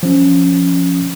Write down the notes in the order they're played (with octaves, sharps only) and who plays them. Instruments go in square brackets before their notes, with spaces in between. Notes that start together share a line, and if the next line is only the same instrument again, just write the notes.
[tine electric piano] F3 C#4